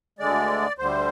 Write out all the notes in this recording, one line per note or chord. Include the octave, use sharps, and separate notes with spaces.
D2 D3 G#3 D5
D2 D3 G3 C5